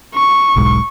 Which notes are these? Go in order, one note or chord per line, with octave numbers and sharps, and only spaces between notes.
C#6
E1 B1 G#2